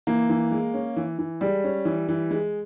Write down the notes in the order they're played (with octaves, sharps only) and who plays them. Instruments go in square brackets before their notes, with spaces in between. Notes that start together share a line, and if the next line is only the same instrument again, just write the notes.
[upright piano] E3 [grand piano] A#3
[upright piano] E3
G#3
C#4
E3
E3
[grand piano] G3 [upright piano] G#3
[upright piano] C#4
E3
E3
G#3